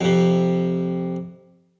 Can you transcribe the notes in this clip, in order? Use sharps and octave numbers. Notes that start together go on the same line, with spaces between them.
F2 C3